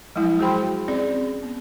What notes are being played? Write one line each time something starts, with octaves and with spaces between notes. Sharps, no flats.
F3 F#3 G#3 E4
F#4 G#4 C5 G5 B5 C6
C4 C#4 G#4 D5
B3